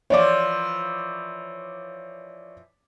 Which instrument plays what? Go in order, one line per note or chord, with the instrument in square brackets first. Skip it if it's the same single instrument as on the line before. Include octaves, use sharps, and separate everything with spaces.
[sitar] E3 F3 [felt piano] C#5 D5 D6